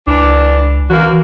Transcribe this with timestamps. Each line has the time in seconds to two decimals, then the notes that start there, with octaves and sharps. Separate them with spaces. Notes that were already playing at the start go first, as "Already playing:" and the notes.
0.07 C#2 E3 D4
0.90 F#2 E3 A#3 F#4